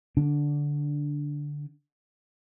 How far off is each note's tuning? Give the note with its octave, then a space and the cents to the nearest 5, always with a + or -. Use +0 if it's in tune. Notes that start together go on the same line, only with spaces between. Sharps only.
D3 -5 D4 -10